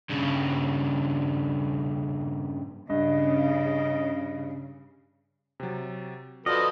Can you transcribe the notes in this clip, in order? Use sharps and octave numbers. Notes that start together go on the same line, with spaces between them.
G2 C#3
G2 C#3 D#5
C3 F#3
F3 F#4 A4 B4 D5 D#5 F6